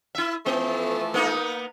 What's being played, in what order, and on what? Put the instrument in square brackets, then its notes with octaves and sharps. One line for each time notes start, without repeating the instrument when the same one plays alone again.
[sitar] E4 E5
[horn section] E3 F3 A3 [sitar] B3
[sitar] A#3 B3 D#4